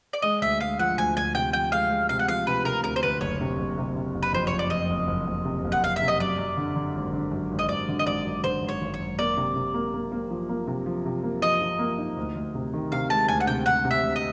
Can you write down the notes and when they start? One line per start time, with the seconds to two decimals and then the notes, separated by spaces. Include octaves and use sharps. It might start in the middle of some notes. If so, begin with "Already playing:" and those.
0.13 D5
0.22 G#3 D#5
0.41 D2 E5
0.60 G#3 F5
0.79 F3 F#5
0.98 D2 G#5
1.17 D2 G#5
1.34 C3 G5
1.53 F3 G5
1.72 G#3 F5
1.90 G#3
2.09 C3 F5
2.19 F#5
2.28 F3 F5
2.47 C3 B4
2.65 C3 A#4
2.84 D2 A#4
2.96 C5
3.03 D2 B4
3.21 F#1 C#5
3.41 C3
3.58 F#1
3.78 C3
3.96 C3
4.15 F#1
4.23 B4
4.33 F2 C5
4.47 C#5
4.53 F#1
4.59 D5
4.70 F2 D#5
4.90 F#1
5.07 F#1
5.27 F#1
5.45 C3
5.65 F#1
5.72 F#5
5.82 F#1 F5
5.96 E5
6.02 C3
6.08 D#5
6.20 F#2 D5
6.38 F#2
6.57 D3
6.76 D3
6.95 G#1
7.13 D3
7.32 F#2
7.51 G#1
7.59 D#5
7.69 G#1 D5
7.88 D3
7.99 D#5
8.06 G#1 D5
8.25 F#2
8.43 D3 C5
8.62 G#1
8.69 C#5
8.81 G#1
8.94 C#5
9.00 F#2
9.19 A#3 D5
9.37 C3
9.56 C3
9.74 A#3
9.94 A#3
10.12 A#3
10.31 F3
10.49 A#3
10.67 C3
10.86 F3
11.06 C3
11.23 A#3
11.42 F3 D#5
11.61 F3
11.79 A#3
11.98 D#4
12.17 D2
12.35 D2
12.55 C3
12.74 D#3
12.92 C3 F5
13.10 G#3 A5
13.28 D2 G#5
13.40 F#5
13.47 C3 G5
13.66 C3 F#5
13.85 C3
13.91 E5
14.03 D2
14.16 D#5